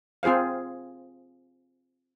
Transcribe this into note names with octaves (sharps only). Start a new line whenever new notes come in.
C4 F4 G#4 C5 F5